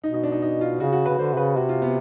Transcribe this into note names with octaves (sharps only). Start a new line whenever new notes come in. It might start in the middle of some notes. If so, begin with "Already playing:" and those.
B2 D#4
D#4
D4
D#4
D#4
F4
C#3 F#4
F#4
C#3 B4
D3 C5
C3
C#3 B4
C3 F#4
F4
B3